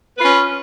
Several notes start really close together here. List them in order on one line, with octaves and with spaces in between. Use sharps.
B4 F4 C#4